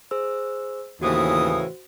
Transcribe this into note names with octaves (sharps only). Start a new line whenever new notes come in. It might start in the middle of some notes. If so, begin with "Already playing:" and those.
G#4 C5 E6
D#2 A2 C#3 E3 F#4 C5 D#6